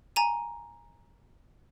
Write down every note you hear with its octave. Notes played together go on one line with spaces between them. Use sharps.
G#5 A#5 D#7